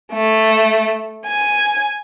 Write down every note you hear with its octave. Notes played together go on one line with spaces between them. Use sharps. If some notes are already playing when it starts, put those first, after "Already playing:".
A3
G#5